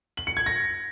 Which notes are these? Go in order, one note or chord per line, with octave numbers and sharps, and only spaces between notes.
F#7
C#7
G#6
A#6